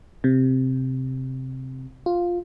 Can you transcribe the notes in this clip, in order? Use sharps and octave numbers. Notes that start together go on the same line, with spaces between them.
C3
F4